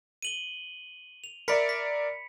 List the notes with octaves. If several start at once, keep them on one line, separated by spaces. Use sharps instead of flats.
D#7 F#7 G7
F7
A#4 D5 E5 B5 B6 C#7
B6